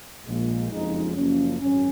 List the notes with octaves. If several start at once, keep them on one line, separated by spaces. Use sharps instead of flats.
A#1 A#2 G#3
F#1 F2 F3 G#3 D#4
F#1 F#2 C#3 F3 A#3 C#4
G#1 F#2 C#4